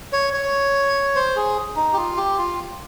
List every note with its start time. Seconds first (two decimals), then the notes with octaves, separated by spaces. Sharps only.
0.13 C#5
0.33 C#5
1.16 C5
1.36 G#4
1.76 D#4
1.93 G4
1.97 F4
2.17 G4
2.38 F4